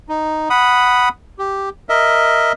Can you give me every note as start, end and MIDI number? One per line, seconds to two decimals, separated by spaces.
0.09 0.49 63
0.50 1.09 78
0.50 1.09 83
0.50 1.09 87
1.39 1.69 67
1.89 2.52 70
1.89 2.52 75
1.89 2.52 76